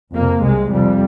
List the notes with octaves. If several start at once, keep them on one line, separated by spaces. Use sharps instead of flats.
F2 C3 A#3
C2 C3 G#3
F2 C3 G3